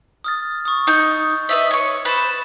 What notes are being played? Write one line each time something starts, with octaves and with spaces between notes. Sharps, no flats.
D#6 F6 A6
C#6 D#6
D#4 G6
B4 D#5 E5
C#5 C#6
B4 C5 F#6 A6 E7